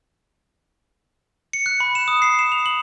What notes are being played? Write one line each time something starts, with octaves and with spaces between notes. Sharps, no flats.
C#7
F#6
B5
E7
D#6
C7
E7
F7
F#7